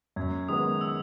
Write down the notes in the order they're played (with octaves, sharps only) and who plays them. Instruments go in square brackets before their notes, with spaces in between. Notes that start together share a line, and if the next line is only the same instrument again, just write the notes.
[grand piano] F#2 [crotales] G#6
[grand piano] D#3 G#3 B3 [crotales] D#6
[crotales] E6